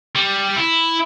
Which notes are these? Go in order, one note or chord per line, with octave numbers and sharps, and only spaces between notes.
G3
E4